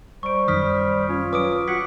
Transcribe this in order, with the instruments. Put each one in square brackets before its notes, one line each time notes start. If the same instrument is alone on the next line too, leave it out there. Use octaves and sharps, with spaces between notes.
[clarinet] G3 [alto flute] C5 [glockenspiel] C#6 D7
[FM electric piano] F#2 D#3 [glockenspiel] D#6 F6 B6
[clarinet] C#4 [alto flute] F4
[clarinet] F#3 [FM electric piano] B4 [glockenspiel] D6 D#6 D7
[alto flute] F#4 [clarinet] F#5 [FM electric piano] C#6 D6 G#6 [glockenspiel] B6